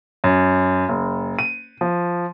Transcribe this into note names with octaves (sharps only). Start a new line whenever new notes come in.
F#2
F#1
D#7
F3